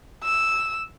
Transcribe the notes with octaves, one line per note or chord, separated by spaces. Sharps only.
E6